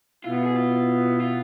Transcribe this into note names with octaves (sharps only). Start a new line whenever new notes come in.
B2 B3 E4 F4
F4
G#4
F4
F4